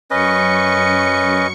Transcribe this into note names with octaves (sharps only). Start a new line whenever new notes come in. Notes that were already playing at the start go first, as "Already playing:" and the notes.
F#2 C#4 B4 D#5 C#6 C#7